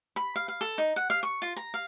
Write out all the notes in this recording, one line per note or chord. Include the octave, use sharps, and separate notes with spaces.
B5
F5
F5
A4
D#4
F#5
F5
C#6
F4
A#5
F5